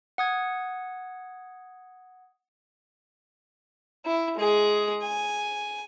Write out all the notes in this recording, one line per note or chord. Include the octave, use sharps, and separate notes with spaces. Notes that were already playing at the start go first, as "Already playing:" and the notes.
F#5 D#6 G#6
E4
G#3 G#4
G#5